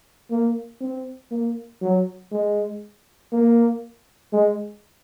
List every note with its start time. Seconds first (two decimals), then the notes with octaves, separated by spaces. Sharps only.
0.31 A#3
0.81 C4
1.31 A#3
1.82 F#3
2.32 G#3
3.33 A#3
4.33 G#3